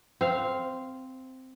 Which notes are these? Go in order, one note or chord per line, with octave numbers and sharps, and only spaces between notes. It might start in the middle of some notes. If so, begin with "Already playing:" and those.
C4 F5